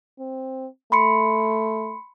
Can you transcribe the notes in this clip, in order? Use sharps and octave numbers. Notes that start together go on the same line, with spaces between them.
C4
A3 B5 C6 C#7